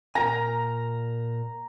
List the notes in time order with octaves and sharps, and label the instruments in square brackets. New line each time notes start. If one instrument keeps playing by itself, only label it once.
[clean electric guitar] A#2 A#4 G#5 [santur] A#5